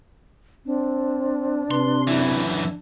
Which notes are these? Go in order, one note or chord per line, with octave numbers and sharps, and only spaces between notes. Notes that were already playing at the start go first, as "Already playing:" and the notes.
C4 D4
C3 B4 C6
F#2 E3 E4